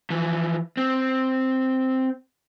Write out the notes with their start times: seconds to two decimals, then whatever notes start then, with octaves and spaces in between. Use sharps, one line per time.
0.10 E3 F3
0.77 C4